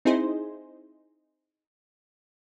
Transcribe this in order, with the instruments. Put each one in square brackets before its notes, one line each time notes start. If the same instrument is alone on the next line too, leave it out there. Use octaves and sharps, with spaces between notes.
[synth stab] C4 D#4 E4 G#4 C5